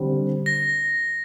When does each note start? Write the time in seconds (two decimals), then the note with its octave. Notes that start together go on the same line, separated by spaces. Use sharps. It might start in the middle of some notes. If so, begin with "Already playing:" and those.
Already playing: D3 G3 C4
0.46 A#6